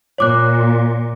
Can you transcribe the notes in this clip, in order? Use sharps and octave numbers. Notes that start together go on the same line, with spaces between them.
A#2 C#5 D6 F#6